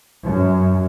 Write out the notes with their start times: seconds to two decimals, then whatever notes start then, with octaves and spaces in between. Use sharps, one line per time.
0.25 F#2